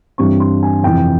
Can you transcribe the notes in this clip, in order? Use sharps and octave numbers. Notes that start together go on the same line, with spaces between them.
G2 E3 G3 C4 C#6
C6
G#5
F2 C3 E3 G5